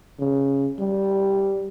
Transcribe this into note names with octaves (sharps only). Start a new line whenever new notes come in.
C#3
G3